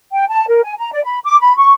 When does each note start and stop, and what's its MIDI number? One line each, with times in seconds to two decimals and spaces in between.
0.13 0.27 79
0.29 0.45 81
0.48 0.63 70
0.64 0.73 80
0.78 0.92 82
0.92 1.03 74
1.05 1.19 83
1.24 1.39 86
1.40 1.55 83
1.57 1.73 85